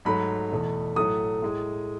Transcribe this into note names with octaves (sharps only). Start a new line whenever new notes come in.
G#2 F#3 A3 B5
E2 B2 A3
A2 F#3 A3 D#6
A2 G#3